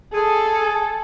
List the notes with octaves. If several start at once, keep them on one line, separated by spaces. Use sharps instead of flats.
G#4 A4